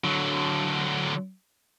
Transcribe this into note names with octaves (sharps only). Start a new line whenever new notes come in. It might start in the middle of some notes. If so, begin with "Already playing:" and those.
D3 F#3